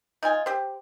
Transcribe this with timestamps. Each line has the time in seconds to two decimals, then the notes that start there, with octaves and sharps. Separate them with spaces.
0.23 D#4 F4 G#5
0.46 G4 C5